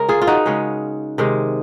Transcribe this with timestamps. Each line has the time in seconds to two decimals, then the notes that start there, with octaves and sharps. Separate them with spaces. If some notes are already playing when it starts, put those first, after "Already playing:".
Already playing: C#3 G#3 C#4 A#4
0.09 F4 G#4
0.22 F4
0.27 D#4 F#4
0.46 C#3 G#3 C#4
1.18 C3 D#3 G#3